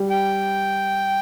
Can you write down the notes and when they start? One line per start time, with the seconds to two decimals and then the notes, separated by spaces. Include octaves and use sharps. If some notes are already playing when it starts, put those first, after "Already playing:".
Already playing: G3
0.10 G5